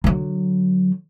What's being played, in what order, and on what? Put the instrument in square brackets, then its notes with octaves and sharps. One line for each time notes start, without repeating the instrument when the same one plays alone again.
[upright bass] D3 F#3